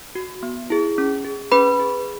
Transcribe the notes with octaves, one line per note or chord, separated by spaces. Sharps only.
F#4
B3
E4 G#4
C#4
G#4
C#4 B4 B5
G#4